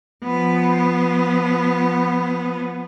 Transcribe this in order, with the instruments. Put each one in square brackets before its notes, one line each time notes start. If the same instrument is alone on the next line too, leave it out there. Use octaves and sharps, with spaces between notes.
[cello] F3 B3